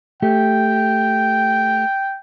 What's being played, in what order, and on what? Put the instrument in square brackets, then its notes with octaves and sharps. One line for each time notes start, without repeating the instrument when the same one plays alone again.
[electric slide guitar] A3 G4 [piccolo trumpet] G5